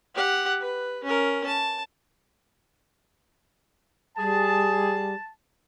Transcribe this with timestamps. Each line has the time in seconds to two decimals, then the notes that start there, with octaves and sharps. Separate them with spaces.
0.15 G4 F#5
0.60 B4
1.04 C#4 A#4
1.46 A5
4.18 G3 G#4 A5